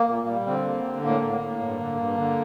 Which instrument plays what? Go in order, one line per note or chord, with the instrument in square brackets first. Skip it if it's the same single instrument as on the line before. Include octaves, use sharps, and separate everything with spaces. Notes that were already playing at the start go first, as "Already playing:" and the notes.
Already playing: [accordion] A#3
A#2
G3
D3 C4
A#3
D3
A2 A#3
A2
A#3
A2
G2
D3
G2
D3